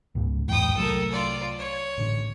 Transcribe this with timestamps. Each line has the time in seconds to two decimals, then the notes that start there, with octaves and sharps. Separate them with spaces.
0.15 C#2 G#2 C#3
0.48 A1 E2 G#2 G5 D#6
0.77 C2 F#3 A3 A4 A#4
1.12 F4 D5
1.59 C#5
1.98 A1 D3